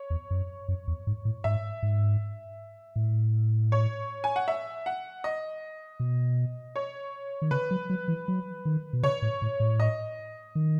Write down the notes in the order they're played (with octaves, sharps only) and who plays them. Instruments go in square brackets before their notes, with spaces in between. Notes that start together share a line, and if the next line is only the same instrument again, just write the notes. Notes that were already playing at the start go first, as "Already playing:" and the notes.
Already playing: [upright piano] C#5
[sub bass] E2
F#2
F#2
E2
G#2
A2
[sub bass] G#2 [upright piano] E5
[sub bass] G#2
A2
[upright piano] C#5
G#5
F#5
E5
F#5
D#5
[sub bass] B2
[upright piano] C#5
[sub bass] D#3
[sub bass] C#3 [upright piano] B4
[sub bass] F#3
F#3
E3
F#3
D#3
B2
[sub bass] C#3 [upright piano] C#5
[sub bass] A2
A2
A2
[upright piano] D#5
[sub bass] D#3